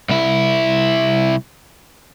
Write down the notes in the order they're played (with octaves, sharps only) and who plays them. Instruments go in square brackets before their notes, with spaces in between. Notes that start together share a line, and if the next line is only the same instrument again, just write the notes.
[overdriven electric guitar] C2 E4